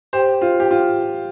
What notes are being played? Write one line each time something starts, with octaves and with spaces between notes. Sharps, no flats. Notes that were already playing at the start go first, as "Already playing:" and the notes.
G4 C5
F4
G4
F4